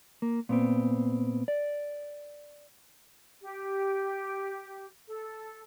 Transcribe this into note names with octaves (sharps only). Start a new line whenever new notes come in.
A#3
A#2 B3 C4
D5
G4
A4